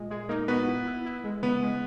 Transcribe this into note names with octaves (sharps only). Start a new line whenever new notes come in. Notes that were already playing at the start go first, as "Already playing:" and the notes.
Already playing: A#2 G#3
G#3 G#4
A#3 D#4 A#4
B3 F#4 B4
E4
E4
E4
G#3
C#3 B3 B4
G#3